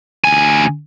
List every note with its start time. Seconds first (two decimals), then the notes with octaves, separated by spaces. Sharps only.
0.24 D2 G#5